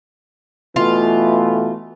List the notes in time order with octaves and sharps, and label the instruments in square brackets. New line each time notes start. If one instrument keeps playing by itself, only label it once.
[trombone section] B2 E3 A3 [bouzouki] F4